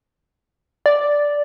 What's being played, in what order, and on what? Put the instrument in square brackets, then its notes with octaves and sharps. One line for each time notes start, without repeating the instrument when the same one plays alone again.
[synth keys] D5